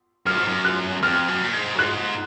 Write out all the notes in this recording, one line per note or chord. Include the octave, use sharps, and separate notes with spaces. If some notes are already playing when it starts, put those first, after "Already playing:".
F#2 F6
G#2
F#2
F#6
F2 F6
F#2
A#2
G#2
F#2
G#2 F#6